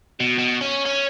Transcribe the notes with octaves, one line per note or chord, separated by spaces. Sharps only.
B2
B2
C#4
C#4